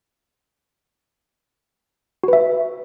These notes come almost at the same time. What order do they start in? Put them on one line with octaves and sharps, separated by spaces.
F#4 B4 E5